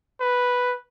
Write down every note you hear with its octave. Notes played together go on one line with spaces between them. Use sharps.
B4